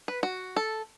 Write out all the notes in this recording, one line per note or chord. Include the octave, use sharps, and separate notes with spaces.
B4
F#4
A4